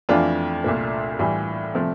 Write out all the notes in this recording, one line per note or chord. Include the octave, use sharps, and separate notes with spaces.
F2 E3 A3 D4 F4
C2 A#2 A3
A2 E3 G3
C3 F3 A3